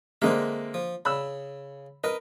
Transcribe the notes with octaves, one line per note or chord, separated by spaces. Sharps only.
D3 G#3 A#3 C4 D#5 E5
F3
C#3 B5 E6
A#4 B4 D#5